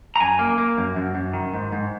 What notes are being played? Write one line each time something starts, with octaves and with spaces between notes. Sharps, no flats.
A#5
F#2 G#5
A#3
A#3
F#2
F#2
F#2
D#3
G#2
G#2